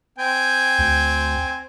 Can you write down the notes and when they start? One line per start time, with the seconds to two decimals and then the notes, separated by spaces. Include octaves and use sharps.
0.18 C4 G5 G#5
0.78 D2